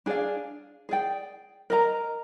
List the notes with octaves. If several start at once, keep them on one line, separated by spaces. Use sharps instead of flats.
D4 G#4 D5 F5
G#4 D5 G5
A#4 D#5 A#5